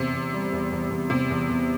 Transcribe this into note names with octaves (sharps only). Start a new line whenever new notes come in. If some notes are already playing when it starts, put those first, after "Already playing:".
Already playing: E2 C3
E2
G3
E2
E2
E2
E2 C3
E2
E2